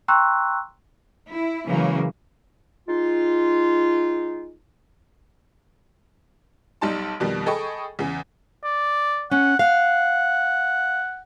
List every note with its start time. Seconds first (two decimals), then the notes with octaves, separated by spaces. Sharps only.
0.08 G5 A#5 C6 C#6 E6 F#6
1.30 E4
1.67 C#3 E3 F#3 G#3 A#3
2.88 G#3 D#4 F4
6.81 B1 G3 D#4 A5 C6
7.20 F2 B2 D#3 G3
7.46 G#4 A4 D#5 G5 B5 C#6
7.99 E2 C#3
8.64 D5
9.32 C#4 F#5
9.59 F5 F#5